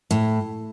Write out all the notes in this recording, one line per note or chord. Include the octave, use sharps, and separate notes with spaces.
A2